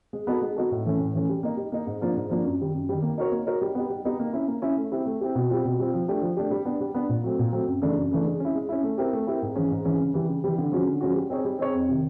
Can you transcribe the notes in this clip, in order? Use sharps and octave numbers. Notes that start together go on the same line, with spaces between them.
G#3
B3 D#4 F#4 A4
G#3
B3 D#4 F#4 A4
A2
E3 A3 C#4
A2
E3 A3 C#4
G3
A#3 D#4
G3
A#3 D#4
G#2
F3 A#3 D4 F4
G#2
F3 A#3 D4 F4
F#2
D#3 G3
F#2
D#3 G3
A#3
D#4 F#4 A#4 C#5
A#3
D#4 F#4 A#4 C#5
G3
B3 D#4 G4
G3
B3 D#4 G4
A#3
C#4 E4
A#3
C#4 E4
A3
C4 E4 G4
A3
C4 E4 G4
B2
G3 C4 F4
B2
G3 C4 F4
F3
A3 D4 G4
F3
A3 D4 G4
G3
B3 D4
G3
B3 D4
A#2
F#3 A3 C4
A#2
F#3 A3 C4
F#2
C#3 E3 A3 D4
F#2
C#3 E3 A3 D4
G#3
C#4 E4
G#3
C#4 E4
A3
C4 E4 G4 A#4
A3
C4 E4 G4 A#4
G#2
E3 G#3 C#4
G#2
E3 G#3 C#4
C#3
E3 G3
C#3
E3 G3
D3
F3 G#3 C#4 F#4
D3
F3 G#3 C#4 F#4
G3
C4 D#4 G#4 C#5
G3
C4 D#4 G#4 C#5
F2
C3 D#3